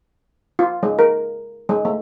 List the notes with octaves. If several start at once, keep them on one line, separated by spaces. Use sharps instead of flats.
F4
G#3
A#4
G#3
A3